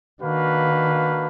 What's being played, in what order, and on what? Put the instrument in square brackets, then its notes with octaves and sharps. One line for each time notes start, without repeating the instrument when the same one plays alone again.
[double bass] D#3 [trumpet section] A#3 D4 F#4 B4 F5